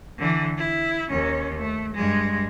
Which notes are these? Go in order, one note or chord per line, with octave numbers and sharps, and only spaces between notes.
D3 E3
E4
D#2 C#4
A3
G2 G#3